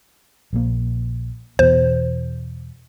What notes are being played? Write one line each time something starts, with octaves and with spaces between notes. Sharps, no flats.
A#1 A#3
E2 B2 C5